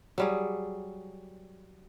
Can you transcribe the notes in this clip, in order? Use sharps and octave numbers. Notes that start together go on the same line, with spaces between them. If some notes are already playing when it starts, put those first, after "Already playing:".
F#3 G3 G#4